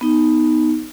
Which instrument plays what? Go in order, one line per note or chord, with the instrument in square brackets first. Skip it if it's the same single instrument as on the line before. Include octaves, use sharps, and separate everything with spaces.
[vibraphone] B3 D#4